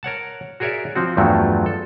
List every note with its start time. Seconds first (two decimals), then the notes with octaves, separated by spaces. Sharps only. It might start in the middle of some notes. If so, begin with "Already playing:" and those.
0.03 A#4 C#5 F#5 A5
0.60 F#4 G#4 A#4 C#5 D5 E5
0.96 F3 C4 F#4
1.17 E2 G2 F3 F#3 A3
1.66 A4